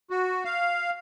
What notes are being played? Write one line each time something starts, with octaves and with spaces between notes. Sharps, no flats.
F#4
F5